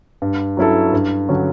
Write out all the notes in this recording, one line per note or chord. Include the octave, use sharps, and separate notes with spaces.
G2
F#3 C#4 E4 A4
G2
D3 F#3 C#4